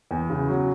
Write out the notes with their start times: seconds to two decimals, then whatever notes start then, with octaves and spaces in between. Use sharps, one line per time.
0.11 E2
0.30 C#3
0.49 F#3